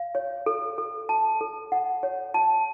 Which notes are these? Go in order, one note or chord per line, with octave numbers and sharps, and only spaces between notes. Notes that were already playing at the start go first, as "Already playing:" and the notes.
Already playing: F5
C#5
A4
A4
A5
A4
F#5
C#5
A5